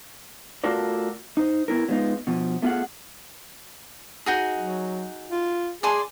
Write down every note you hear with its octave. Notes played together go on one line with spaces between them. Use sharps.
A3 F4 F#4 A4 A#4 D5
D#4 C5
B3 E4 A#4
F#3 G#3 A3 B3 D#4 F4
B2 F3
A3 B3 F4 F#4 G#4 F#5
D#4 F#4 G#4
F#3
F4
G#4 D5 G#5 C6